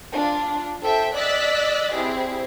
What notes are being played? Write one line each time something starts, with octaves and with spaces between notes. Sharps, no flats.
D4 F4
A4 C5 E5 G5
D5 D#5 E6 F#6 A6 B6
C4 E4 G4 G#4